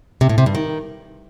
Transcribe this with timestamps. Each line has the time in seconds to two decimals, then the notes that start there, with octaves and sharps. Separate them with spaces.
0.21 C3
0.29 A2
0.38 C3
0.46 G2
0.55 D#3